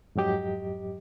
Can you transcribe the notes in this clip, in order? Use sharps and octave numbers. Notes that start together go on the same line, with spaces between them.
F2 G#2 F#3 G4 D#5